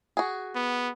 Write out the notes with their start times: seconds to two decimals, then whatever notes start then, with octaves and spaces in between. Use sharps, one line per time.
0.17 F#4 G#4
0.55 B3